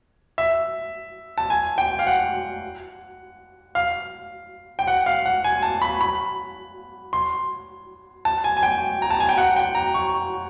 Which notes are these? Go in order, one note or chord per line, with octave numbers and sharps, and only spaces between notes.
E5
A5
G#5
G5
F5
F#5
F5
G5
F#5
F5
F#5
G#5
A5
B5
B5
C6
A5
G#5
G#5
G5
A#5
A5
G#5
G5
F#5
G5
A#5
C#6